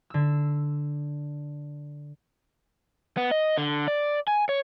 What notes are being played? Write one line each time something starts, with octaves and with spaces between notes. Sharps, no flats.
D3 E6
B3
D#5
D3
D5
G#5
C#5